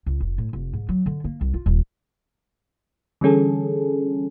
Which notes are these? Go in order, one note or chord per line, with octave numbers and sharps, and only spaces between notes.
C#2
F1
A2
F1
G#2
F#3
D3
A#3
C2
F4
D#1
D3 E3 G3 C#4 G#4 A4